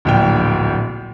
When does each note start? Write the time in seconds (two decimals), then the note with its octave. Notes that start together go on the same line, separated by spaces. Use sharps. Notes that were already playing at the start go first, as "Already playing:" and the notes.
0.05 D1 A#1 G5